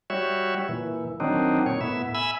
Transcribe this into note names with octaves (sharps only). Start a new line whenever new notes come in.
G3 F#4 C#5 E5
A#2 E3
D#3 F#3 C4 D4 D#4
A#2 C#5
A2 B3 E5
E5 G#5 B5 E6